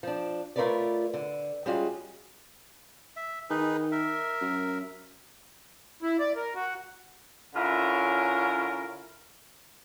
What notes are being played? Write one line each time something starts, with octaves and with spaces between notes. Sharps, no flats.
F3 D4
A3 F4 A#4 B4 C#5 D5
D3
G3 G#3 C#4 F4 F#4 G#4
E5
D#3 D#4 G#4 B4
A#4 E5
F#2
E4
D5
A#4
F#4
D3 C#4 E4 F4 A#4 C#5